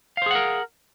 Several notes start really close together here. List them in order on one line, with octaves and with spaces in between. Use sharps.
F5 C5 G#4 F#5 A#4